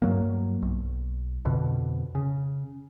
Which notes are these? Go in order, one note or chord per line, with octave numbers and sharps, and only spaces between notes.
G2 F#3 A#3
B1
F2 B2 D3
C#3